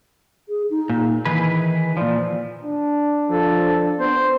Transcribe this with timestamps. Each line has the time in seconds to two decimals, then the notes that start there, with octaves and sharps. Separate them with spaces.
0.49 G#4
0.70 D#4
0.90 A#2
1.25 D#3 E3 G#4 B4
1.97 A#2 F3 D5
2.64 D4
3.30 F3 A4
3.99 B3 C5